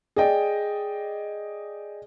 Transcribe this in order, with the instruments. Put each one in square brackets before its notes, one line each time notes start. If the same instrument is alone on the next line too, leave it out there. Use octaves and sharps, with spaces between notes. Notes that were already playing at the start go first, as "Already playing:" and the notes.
[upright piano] G#4 D5 D#5 G5